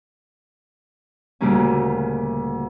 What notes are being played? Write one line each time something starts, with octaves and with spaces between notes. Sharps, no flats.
D2 A#2 C#3 G3 A#3 C#4